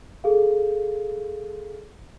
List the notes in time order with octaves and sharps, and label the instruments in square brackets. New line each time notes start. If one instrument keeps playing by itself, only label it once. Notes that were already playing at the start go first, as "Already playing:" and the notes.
[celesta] G#4 A4 F5